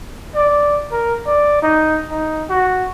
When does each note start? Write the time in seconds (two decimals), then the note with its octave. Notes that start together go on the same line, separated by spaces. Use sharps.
0.35 D5
0.92 A#4
1.26 D5
1.62 D#4
2.11 D#4
2.50 F#4